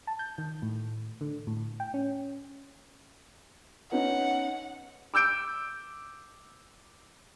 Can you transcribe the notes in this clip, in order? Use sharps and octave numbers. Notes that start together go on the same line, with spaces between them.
A5
G6
D#3
A2
D3
A2
G5
C#4
B3 C#4 D#4 F#5
D6 E6 G6 D7